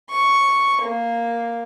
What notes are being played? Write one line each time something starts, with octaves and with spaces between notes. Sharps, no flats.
C#6
A#3